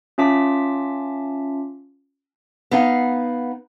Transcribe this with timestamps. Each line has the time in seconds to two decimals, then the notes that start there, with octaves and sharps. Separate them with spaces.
0.18 C#4 F4 E5 A5 D6 B6
2.71 B3 D#4 F5